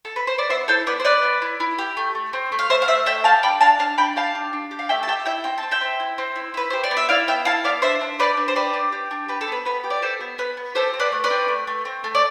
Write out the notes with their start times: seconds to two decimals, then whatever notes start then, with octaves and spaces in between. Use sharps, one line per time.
0.05 A4
0.16 B4
0.27 C5
0.38 D5
0.49 B3 C5 E5
0.68 E4 A4 C5
0.87 B3 B4 D5
1.00 C5
1.05 B3 B4 D5
1.23 B3
1.42 E4
1.60 E4
1.78 G4
1.97 A3
2.15 A3
2.33 C4
2.52 A3
2.59 F5
2.69 A3 C5 E5
2.82 F5
2.88 A3 C5 E5
3.06 A3 E5 G5
3.24 G4 F5 A5
3.43 D4 G5 B5
3.61 D4 F5 A5
3.79 D4 F5 A5
3.98 D4 G5 B5
4.16 G4 F5 A5
4.35 D4
4.53 D4
4.71 G4
4.79 F5
4.89 A3 E5 G5
5.03 A5
5.07 G4 E5 G5
5.26 E4 E5 G5
5.44 C4 G5
5.58 C4 A5
5.71 E5 G5
5.81 C4
6.00 E4
6.18 C4
6.36 E4
6.54 E4 B4
6.70 G4 C5
6.84 D5
6.91 B3
6.97 E5
7.09 E4 D5 F5
7.27 B3 E5 G5
7.45 E4 F5 A5
7.64 B3 D5 F5
7.82 D4 C5 E5
8.01 D4
8.19 G4 B4 D5
8.37 D4
8.48 C5
8.55 G4 B4 D5
8.74 D4
8.92 G4
9.11 D4
9.28 G4 B4
9.41 A4
9.48 B3 B4
9.65 B3 B4
9.84 G4
9.90 D5
10.02 G4 A4 C5
10.21 B3
10.38 B3 B4
10.57 B3
10.75 G4 A4 C5
10.94 C4
11.00 B4 D5
11.12 A3
11.24 B4 D5
11.30 C4
11.48 A3
11.67 A3
11.85 C4
12.04 A3
12.15 D5